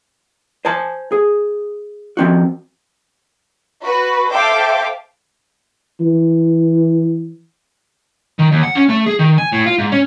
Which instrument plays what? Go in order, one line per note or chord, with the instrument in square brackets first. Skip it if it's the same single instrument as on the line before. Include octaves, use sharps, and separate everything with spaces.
[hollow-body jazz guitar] C5 G#5 A5
G#4
F3 C4 F#4
[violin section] F#4 B4
A4 C5 E5 F5 G5 D6
[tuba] E3
[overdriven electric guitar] D#3
D#2
F#5
C#4
A3
G#4
D#3
G#5
A2
F4
G#2
C#4